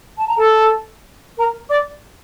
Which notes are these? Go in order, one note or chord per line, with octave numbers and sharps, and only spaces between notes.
A5
A#5
A4 A5
A#4 A#5
D5 D6